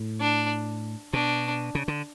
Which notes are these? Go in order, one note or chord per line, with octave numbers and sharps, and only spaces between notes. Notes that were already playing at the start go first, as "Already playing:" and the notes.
Already playing: A2
D4
B2 D4
C#3
D3